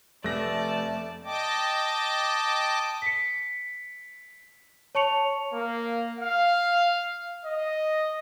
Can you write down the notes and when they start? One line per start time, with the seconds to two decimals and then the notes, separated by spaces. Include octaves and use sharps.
0.24 F1 A3 D5 A5 A#6
1.24 D#5 G5 A5 D6
3.02 B6 C#7
4.95 C#5 A5 C#6 C#7 F7
5.53 A#3
6.19 F5
7.45 D#5